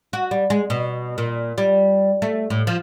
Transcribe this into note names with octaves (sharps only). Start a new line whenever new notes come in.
F#4
G3
G#3
B2
A#2
G3
A3
A2
F3